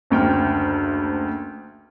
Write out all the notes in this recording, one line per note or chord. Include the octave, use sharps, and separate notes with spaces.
F#1 D2 G5 F6